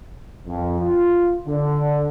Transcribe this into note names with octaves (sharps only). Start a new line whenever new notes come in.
F2
F4
D3